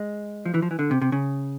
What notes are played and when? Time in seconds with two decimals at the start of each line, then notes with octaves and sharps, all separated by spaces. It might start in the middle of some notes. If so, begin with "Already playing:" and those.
Already playing: G#3
0.45 F3
0.54 E3
0.62 F3
0.71 E3
0.79 D3
0.91 C3
1.02 C3
1.12 C#3